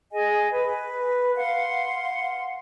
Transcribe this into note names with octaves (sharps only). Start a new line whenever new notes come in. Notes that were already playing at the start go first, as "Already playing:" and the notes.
G#4 D#5 G#5
B4
F5 F#5 C6